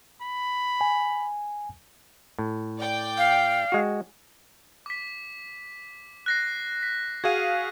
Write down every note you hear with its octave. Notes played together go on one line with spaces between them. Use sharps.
B5
G#5
A2
D5 G5
F5
G#3 F#4
D6 B6
F#6 A#6 C7
B6
F#4 G#4 F5 G#6 D#7